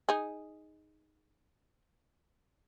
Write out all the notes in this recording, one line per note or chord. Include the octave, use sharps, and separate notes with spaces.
D#4 G#4